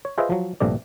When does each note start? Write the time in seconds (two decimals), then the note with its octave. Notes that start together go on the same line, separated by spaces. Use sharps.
0.05 C#5
0.18 F4 G#4 B4 C5 D#5 E5
0.30 F3 F#3
0.60 A#1 G2 C3 A3 D5